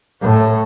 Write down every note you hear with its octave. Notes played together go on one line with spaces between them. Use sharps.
A2